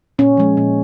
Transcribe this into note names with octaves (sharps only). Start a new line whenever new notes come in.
A#2 C#4
F3 G#3
A#2